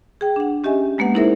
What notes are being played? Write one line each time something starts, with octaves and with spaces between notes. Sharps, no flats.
G#4 G5
D4 F#5
C#4 G4 D#5 E5 G#5
G#3 A#3 B3 B4 F#5
D#4 E4 G#4 A#4 C5 E5